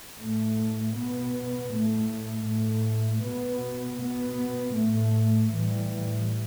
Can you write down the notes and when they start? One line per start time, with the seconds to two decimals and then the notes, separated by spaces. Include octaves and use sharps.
0.19 A2 A3
0.95 B2 B3
1.71 A2 A3
2.47 A2 A3
3.24 B2 B3
3.99 B2 B3
4.76 A2 A3
5.52 A2 E3 G3